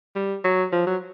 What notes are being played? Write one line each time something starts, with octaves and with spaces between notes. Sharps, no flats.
G3
F#3
F3
F#3